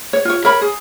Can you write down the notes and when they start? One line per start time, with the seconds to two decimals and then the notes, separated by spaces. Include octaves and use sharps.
0.13 C#5
0.25 F4 C#5
0.45 A#4 C#5 B5
0.61 G#4